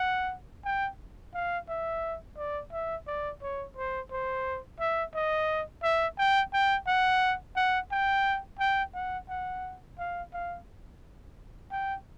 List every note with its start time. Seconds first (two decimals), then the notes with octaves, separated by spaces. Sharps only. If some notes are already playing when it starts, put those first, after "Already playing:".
Already playing: F#5
0.65 G5
1.34 F5
1.69 E5
2.37 D5
2.72 E5
3.07 D5
3.42 C#5
3.77 C5
4.11 C5
4.80 E5
5.14 D#5
5.83 E5
6.18 G5
6.53 G5
6.87 F#5
7.56 F#5
7.91 G5
8.59 G5
8.94 F#5
9.29 F#5
9.98 F5
10.33 F5
11.71 G5